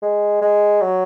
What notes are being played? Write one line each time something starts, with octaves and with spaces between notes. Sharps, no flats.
G#3
G#3
F#3